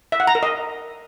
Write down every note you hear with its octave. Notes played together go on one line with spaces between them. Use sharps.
E5
F#5
A#5
A#4
D#5